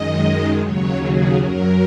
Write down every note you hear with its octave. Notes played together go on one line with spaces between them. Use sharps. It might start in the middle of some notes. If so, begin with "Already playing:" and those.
Already playing: F#2 D#3 G#3 D#5
D#2 C#3 F#3 C#5
G#4
F#2 F#3 A#4